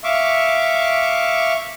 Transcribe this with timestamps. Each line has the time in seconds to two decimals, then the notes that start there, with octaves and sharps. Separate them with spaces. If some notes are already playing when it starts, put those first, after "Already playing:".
0.04 E5 F5 C#6 D6